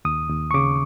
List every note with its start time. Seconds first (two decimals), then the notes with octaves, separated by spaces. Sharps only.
0.05 D#2 D#6
0.29 D#2
0.51 C#6
0.54 C#3 D6